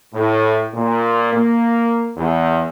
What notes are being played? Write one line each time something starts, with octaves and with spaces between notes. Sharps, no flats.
A2
A#2
A#3
E2